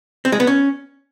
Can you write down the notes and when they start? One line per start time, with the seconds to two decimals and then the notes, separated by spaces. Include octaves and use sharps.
0.25 C4
0.32 G#3
0.40 B3
0.47 C#4